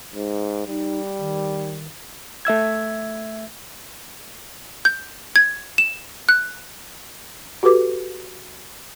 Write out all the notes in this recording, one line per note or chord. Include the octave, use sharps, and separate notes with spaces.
G#2
G3 D#4
D#3
A3 E5 E6 G#6
G6
G#6
E7
F#6
F#4 G4 A4 B4 D6